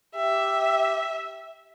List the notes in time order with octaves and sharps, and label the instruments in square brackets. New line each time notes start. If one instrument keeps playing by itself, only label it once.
[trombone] G4 [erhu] E5